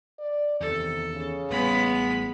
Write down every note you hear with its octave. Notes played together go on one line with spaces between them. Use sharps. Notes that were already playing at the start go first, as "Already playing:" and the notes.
D5
E2 C3 D#3 A4
C#3
A1 G3 G#3 A#3 B3 B5